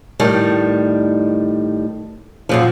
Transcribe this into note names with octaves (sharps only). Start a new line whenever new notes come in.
A2 D#3 G3
F#2 A#2 F3